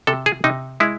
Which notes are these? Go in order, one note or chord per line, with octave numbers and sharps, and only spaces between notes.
C3 A4
G#4
C3 D#4
G#3 E4